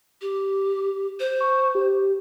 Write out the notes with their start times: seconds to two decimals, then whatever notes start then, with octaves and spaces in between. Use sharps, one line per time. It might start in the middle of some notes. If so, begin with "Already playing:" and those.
0.21 G4
1.20 C5
1.40 C#6
1.75 G4